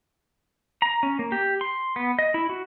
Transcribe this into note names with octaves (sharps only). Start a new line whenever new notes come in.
A#5
C#4
A#3
G4
C6
B3
D#5
E4
F#4